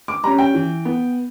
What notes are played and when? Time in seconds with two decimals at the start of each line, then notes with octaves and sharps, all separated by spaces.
0.08 D6
0.24 G3 C#4 A#5
0.38 G5
0.54 E3
0.85 B3